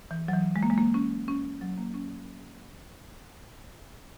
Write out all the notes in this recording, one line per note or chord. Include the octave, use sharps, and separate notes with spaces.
E3
F#3
E3
G#3
A#3
G#3
A#3
C#4
C#4
F#3
A#3
C#4